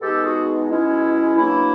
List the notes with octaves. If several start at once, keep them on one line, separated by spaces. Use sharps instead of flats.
B2 G#3 B3 D#4 G4 A4
F#4 G#4
B2 G#3 C#4 E4
B2 F#3 A#3 D4 E4